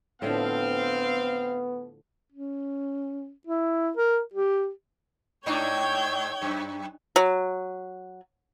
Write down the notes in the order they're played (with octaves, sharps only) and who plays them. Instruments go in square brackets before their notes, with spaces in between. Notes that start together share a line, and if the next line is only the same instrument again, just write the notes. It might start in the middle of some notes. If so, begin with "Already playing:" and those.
[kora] A2 D3 F3 [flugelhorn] B3 [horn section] C4 F5
[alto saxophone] C#4
E4
A#4
G4
[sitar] G#2 D4 D#4 [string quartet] C#5 G5 G#6
[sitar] F#2
[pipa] F#3